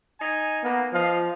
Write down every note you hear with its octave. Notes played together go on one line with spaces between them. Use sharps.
D#4 G#5
A#3 B3
F3 D#5 F5